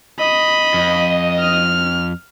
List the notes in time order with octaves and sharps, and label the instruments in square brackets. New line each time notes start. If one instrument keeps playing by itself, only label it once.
[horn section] D#5 [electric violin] B5
[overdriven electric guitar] F2
[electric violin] F6